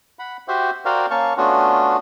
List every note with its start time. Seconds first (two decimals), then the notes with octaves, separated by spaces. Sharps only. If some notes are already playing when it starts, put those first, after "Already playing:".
0.19 F#5 B5
0.48 F#4 G4 C5 E5
0.85 F#4 A#4 C5 D5 F5 G5
1.10 A#3 C#4 F5 A5 C#6
1.37 A3 B3 C#4 D4 F4 F#4